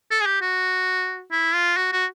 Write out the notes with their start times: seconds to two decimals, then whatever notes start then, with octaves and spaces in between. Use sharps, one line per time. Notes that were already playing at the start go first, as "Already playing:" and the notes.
0.11 A4
0.20 G#4
0.26 G4
0.42 F#4
1.32 E4
1.55 F4
1.77 F#4
1.92 F#4